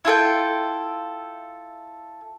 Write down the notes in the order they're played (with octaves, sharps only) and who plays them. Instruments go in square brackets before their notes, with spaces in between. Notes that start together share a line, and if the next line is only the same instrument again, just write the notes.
[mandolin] E4 F4 A4 G5